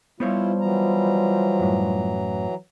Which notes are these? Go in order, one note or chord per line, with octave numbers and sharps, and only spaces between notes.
F3 G3 B3 E4 F4 C5 C#5
E3 F#3 A#5
F#2 A2